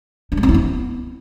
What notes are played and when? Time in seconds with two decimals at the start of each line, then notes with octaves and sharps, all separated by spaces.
0.32 D4
0.37 G#3
0.43 C4
0.49 E4
0.54 B3